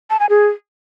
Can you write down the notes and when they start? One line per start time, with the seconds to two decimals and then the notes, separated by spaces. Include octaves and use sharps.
0.10 A5
0.20 G#5
0.30 G#4